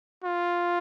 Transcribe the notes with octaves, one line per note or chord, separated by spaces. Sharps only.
F4